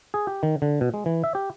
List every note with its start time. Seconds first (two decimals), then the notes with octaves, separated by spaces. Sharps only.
0.14 G#4
0.27 G4
0.43 D#3
0.62 D3
0.81 B2
0.94 G#3
1.06 E3
1.24 E5
1.35 G4